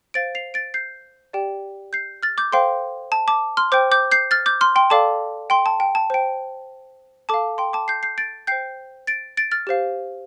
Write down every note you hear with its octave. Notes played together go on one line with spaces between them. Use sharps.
C5 F5 A6 D7
C7 F7
A6 D7
G6 C7
G4 D5 G5
G6 C7
F6 A6
D6 G6
A4 C5 F5 G5 C6
A5
A5 D6
C6 F6
C5 G5 D6 G6
D6 G6
G6 C7
F6 A6
D6 G6
C6 F6
G5 C6
A4 D5 F5 A5 D6
G5 C6
A5
G5
A5
C5 G5
A4 A5 D6
F5
G5 C6
A5 D6
G6 C7
G6 C7
A6 D7
C5 G5 G6 C7
A6 D7
A6 D7
F6 A6
G4 C5 F5